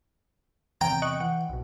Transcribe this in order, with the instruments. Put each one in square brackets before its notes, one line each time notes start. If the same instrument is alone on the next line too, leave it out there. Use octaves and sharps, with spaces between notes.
[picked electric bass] E2 C3 [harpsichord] G5 [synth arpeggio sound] A#5
[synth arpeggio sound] D#5 C#6 F#6
[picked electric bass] E3 [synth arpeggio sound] F#5
[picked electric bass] B1 B2